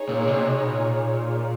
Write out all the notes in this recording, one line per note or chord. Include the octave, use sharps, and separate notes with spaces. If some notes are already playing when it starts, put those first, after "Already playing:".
Already playing: D#4 G#4 C#5
A#2
C3
B2
A#2